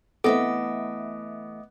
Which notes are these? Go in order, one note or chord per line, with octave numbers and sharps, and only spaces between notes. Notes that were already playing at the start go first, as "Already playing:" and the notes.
E3 A3 B3 C4 A4 D#5 E5 D6